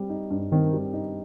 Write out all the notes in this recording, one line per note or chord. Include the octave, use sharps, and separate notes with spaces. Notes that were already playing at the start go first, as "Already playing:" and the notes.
Already playing: G3 C4
D#4
G2
D#3 C4
G3
D#4